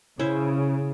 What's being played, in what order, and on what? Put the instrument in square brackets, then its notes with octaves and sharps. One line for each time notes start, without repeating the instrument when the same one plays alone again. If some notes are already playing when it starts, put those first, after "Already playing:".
[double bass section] C#3 [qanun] C#4 E4 C5